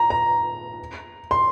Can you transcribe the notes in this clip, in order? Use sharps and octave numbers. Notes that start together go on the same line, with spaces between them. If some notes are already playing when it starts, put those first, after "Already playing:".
Already playing: A#5
A#5
C6